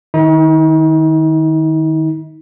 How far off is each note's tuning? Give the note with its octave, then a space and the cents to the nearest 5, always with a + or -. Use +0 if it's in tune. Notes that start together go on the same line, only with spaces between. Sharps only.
D#3 -10 D#4 +45